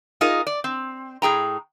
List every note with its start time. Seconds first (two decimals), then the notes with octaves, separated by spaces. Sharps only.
0.21 D#4 F4 G#4 A#4 D#5
0.47 D5
0.64 C4
1.22 A2 G#4 G5 A#5